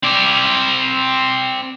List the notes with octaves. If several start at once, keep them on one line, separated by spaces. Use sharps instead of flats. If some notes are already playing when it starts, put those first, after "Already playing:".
C4 D5